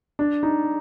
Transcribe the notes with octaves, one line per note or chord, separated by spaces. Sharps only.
D4
D#4